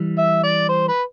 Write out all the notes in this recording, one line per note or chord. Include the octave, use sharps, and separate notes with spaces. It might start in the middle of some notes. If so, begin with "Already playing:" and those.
Already playing: E3 G3
E5
D5
C5
B4